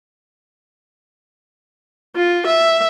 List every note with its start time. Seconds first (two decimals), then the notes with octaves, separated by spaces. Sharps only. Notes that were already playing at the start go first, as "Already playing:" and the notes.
2.16 F4
2.47 E5